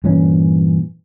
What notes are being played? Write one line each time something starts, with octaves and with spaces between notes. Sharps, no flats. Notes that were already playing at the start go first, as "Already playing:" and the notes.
G2 A#2 E3 C#4